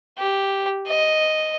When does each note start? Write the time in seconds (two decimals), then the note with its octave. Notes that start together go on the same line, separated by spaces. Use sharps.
0.18 G4
0.87 D#5